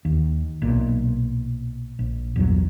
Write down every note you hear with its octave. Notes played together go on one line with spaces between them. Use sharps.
D#2
B1 A#2
A#1
A#1 E2 G2 F#3